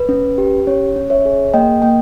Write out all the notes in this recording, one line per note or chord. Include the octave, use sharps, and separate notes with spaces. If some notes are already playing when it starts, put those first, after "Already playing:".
Already playing: B4
C#4
G4
C#4 C#5
C#4
C#5 E5
G#4
A#3 D#5 G5
A#3 D#5 G5